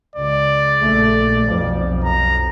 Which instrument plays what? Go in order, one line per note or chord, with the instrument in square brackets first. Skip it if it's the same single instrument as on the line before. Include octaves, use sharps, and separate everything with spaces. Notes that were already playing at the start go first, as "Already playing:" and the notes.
[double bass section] C#2 [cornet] D5
[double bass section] A#1 A3
B1 F2 F3
[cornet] A#5